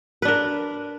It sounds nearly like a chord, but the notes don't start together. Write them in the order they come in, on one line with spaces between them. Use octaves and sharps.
B4 D4 A#4